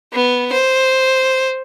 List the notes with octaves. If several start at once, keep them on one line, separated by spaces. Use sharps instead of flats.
B3
C5